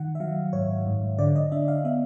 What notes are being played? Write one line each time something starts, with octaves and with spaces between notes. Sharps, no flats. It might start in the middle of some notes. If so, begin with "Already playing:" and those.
Already playing: D#3 F#5
E5
F#3 F5
G#2 C#5
G#2
D3 D5
D#5
D4 E5
F5
B3 E5